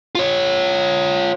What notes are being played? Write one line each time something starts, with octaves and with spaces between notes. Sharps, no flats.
F4 C#5